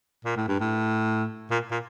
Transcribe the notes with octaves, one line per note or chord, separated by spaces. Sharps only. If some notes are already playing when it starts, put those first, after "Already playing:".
A#2
A2
G2
A2
A#2
A#2